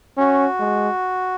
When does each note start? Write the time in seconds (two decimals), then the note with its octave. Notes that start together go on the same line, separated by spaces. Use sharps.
0.18 C#4 F#4
0.60 G#3